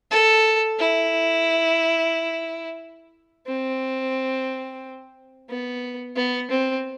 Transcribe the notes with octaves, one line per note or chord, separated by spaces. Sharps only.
A4
E4
C4
B3
B3
C4